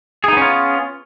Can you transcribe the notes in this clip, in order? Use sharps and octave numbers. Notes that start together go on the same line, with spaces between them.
B3 C#4 D#4 F4 G#4